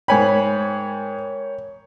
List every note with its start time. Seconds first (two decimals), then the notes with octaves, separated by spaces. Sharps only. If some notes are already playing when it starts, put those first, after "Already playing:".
0.08 G#2 A#4 C#5 G5 G#5 B5